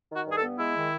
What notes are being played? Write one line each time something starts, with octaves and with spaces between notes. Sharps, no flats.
D#3 F#4
G2 G#4
A4
B3
G#3 E4
D#3